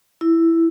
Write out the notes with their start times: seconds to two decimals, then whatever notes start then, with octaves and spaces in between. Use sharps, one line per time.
0.21 E4